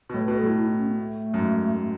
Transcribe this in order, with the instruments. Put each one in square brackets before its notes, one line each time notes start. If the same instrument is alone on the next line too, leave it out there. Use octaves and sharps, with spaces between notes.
[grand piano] B2
[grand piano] A2 [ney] C#5
[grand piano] B2 [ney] B4
[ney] A4
[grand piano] A2 [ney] E4
[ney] E4
D#4
C#4
B3
A3
[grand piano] F#2
G#2